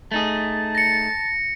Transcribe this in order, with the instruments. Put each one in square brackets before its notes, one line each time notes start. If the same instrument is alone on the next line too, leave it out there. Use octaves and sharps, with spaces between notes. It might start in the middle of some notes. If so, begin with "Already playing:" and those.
[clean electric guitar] A3 D#4 G#4 [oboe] A5
[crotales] A#6 C#7